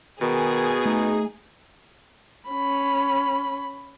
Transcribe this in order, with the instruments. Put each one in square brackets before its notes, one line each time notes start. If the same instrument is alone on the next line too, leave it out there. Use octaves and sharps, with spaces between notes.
[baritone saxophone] B2 [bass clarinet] D#3 [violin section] G#4
[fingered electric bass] A3 [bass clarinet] D#4
[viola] C#4 B5